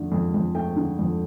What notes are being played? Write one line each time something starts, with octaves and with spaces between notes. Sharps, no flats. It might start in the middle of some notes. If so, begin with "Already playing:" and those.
Already playing: F2 D3 A3
F2
F2
A3 G5
D3
F2